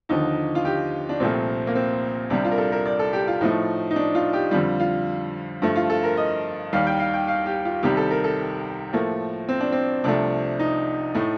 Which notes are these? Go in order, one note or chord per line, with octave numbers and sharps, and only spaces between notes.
D#2 D3 F3 D#4
F4
G4
D4
C2 A#2 F3 A3 C4
A#3
C4
C2 C3 G3 D4
F4
A#4
A4
A#4
D5
A4
G4
F4
A2 F3 A3 D#4
D#4
D4
F4
G4
F2 D3 G3 F4
F4
G2 F3 A3
F4
A4
A#4
D#5
D#2 D#3 G3 F5
G5
F5
G5
F5
G4
F4
C2 C3 D#3 G3 G4
A4
A#4
A4
A2 F3 A3 A#3
C4
D4
C4
C2 C3 F3 A3 D4
D#4
A2 A3